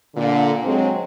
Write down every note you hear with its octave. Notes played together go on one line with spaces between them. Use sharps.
A#2 D3
F#3 G#3 C4